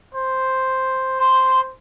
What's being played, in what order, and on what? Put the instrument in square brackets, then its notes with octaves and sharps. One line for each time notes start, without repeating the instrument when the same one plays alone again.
[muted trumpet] C5
[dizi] C6